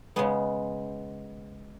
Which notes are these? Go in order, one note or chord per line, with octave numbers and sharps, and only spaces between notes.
C#3 G#3 B3